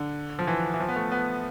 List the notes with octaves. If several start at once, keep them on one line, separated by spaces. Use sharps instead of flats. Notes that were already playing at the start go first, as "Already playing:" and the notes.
Already playing: D3
F3
E3
E3
F3
B3
A3
B3